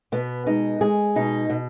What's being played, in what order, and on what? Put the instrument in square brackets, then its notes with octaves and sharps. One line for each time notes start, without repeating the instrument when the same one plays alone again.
[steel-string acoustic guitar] B2 B3
G#3 D#4
G#3 G#4
B2 D#4
B2